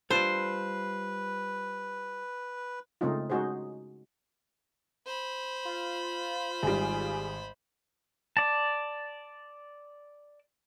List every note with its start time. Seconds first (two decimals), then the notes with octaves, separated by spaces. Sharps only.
0.11 G3 F4 A4 B4 C5
3.01 C#3 G#3 A3 C4 D#4 F4
3.30 G#3 C#4 D#4 F#4 G#4 C5
5.06 C5 B5
5.65 F4
6.63 G#1 G3 G#4
8.37 D5 A5